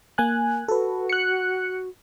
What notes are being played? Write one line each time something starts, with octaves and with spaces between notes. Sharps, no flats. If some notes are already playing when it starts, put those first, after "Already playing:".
A#3 G#5 F#6
F#4 A4 B4
F#6 C#7